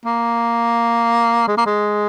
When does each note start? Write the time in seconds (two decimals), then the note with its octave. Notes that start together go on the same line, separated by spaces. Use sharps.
0.05 A#3
1.48 G#3
1.57 A#3
1.66 G#3